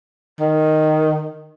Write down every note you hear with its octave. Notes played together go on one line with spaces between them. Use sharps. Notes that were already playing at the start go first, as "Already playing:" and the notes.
D#3